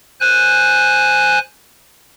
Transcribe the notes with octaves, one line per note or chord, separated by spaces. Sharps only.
C5 G#5 F#6